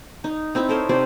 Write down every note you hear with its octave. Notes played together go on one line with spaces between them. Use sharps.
D#4
C4 D#4 E4
A4 A#4 C5 C#5
C3 D#4 C5 D5